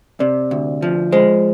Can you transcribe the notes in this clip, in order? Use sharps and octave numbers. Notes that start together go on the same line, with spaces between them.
C3 D5
D2
F3
G#3 C5